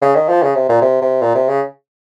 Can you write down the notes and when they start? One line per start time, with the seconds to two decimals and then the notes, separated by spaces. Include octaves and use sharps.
0.02 C#3
0.15 D#3
0.29 F3
0.43 C#3
0.55 C3
0.69 A#2
0.82 C3
1.02 C3
1.22 A#2
1.35 C3
1.49 C#3